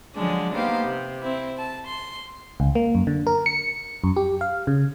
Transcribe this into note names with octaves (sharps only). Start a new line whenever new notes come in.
D3 F3 F#3 G#3 D4
A#3 B3 D#4 G4 C5 F5
C3
C4 E4
A5
C6
C#2
A#3
F#2
D3
A#4
C#7
F#2
G4
F5
C#3